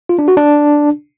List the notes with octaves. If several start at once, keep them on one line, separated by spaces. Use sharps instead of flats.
F4
D4
F#4
D4